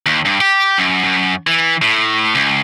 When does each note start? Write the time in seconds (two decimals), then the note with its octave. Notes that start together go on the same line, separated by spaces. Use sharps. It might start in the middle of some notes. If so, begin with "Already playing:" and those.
0.06 D#2
0.25 G2
0.41 G4
0.78 F#2
1.04 F#2
1.47 E3
1.82 A2
2.35 C#2